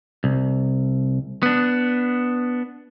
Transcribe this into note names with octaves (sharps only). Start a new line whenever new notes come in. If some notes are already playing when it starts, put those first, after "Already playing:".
C2
B3 D4